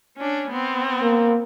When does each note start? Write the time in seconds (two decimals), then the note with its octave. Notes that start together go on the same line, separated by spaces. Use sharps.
0.17 C#4 D4
0.51 B3 C4
1.02 A#3